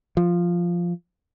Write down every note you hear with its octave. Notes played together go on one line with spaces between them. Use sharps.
F3